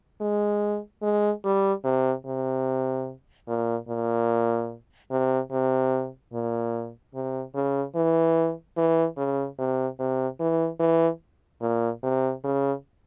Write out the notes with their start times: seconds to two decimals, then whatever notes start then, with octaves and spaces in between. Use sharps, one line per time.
0.21 G#3
1.03 G#3
1.44 G3
1.84 C3
2.26 C3
3.48 A#2
3.88 A#2
5.11 C3
5.51 C3
6.33 A#2
7.14 C3
7.55 C#3
7.95 E3
8.77 E3
9.17 C#3
9.59 C3
9.99 C3
10.40 E3
10.80 E3
11.61 A#2
12.03 C3
12.44 C#3